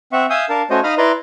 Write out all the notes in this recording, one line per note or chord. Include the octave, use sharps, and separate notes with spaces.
C4 E5 F#5 C#6
E5 F5 G#5 D#6 E6 G6
D4 A#4 F5 A5
A3 C#4 F#4 C5 C#5 D#5
D#4 D#5 F5 B5 D#6 F6
E4 B4 D5 A#5 C6